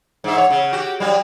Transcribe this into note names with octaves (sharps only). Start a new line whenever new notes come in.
G#2 E5
C#5
C#3
F#4 G4
F#3 G3